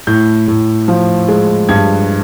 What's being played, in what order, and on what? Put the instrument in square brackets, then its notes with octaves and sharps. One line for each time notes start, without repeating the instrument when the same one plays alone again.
[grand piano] A2 G6
A2
F3
G#3
G2 G#6